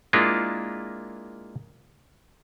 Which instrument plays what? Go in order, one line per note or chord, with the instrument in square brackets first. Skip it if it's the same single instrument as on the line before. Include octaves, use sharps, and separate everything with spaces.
[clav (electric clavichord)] G#3 A#3 D4 E4 F4